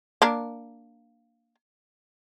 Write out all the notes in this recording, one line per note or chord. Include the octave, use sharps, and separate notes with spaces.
A#3 D4 A#4